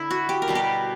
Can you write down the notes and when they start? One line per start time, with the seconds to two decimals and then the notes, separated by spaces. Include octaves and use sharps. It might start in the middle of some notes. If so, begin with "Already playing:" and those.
Already playing: D3 E4
0.11 F#4
0.29 G4
0.42 A#4
0.48 B2 G3 B3
0.55 G4